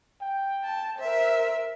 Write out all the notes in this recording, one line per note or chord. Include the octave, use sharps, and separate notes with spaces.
G5
A5
A#4 C5 E5